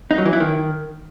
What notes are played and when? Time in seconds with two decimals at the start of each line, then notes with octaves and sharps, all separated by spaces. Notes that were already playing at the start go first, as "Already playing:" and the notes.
0.11 D#4
0.18 F#3
0.25 E3
0.33 E4
0.40 D#3